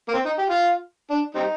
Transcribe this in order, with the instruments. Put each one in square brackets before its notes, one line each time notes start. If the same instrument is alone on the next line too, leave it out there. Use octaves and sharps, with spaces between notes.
[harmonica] A#3
C4
D#4
G4
F4
D4
G3 C4 D#4